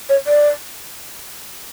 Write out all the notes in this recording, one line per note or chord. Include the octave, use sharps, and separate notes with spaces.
C#5
D5